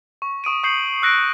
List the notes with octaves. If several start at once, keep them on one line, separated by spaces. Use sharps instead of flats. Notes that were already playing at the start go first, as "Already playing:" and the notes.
C#6
C#6 D#6 D7 D#7
C#6 D#6 G6 C7 C#7 F#7
E6 F#6 A#6 C7 D7